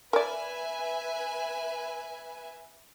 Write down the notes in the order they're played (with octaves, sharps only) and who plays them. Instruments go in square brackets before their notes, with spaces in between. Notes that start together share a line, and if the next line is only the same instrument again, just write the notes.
[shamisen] A#4 D5 [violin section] B4 E5 G#5